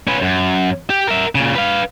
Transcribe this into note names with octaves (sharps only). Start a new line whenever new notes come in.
C#4 B4
F#2
G4
A#4 E5
A#2 C#3
B4 F5